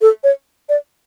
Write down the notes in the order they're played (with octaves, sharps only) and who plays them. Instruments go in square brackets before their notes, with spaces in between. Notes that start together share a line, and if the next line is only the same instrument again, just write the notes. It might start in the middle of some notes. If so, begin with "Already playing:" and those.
[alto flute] A4
C#5
D5